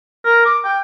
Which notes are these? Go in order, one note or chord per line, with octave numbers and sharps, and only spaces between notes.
A#4
D6
G5